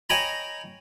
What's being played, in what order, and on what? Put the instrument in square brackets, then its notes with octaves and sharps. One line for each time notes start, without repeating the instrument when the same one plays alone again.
[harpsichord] C#5 D#5 G5 G#5 A#5 B5